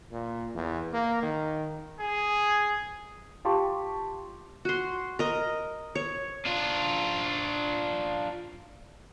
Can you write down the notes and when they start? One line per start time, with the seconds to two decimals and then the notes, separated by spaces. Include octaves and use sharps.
0.12 A#2
0.55 E2
0.93 A#3
1.23 D#3
2.00 G#4
3.45 F4 G4 A5 C6 C#6
4.65 F#4 C6
5.19 A#4 D#5
5.95 C#5
6.46 D4 F4